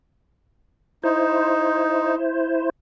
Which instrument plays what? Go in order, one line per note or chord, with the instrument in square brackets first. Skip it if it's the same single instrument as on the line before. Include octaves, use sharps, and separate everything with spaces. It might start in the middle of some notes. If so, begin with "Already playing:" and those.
[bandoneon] D#4 [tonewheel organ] E4 C5